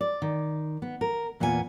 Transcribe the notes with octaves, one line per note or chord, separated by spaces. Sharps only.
D5
D#3
B3
A#4
E2 A#2 B3 G4 G#5